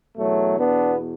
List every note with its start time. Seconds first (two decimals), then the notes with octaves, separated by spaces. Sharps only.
0.17 E2 B2 F#3 A3
0.59 B3 D4